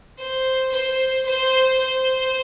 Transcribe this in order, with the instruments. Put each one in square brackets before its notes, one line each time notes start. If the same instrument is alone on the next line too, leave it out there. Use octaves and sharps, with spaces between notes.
[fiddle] C5
C5
C5
C5